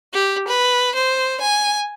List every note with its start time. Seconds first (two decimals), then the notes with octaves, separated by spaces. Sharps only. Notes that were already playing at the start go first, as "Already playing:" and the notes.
0.13 G4
0.48 B4
0.95 C5
1.41 G#5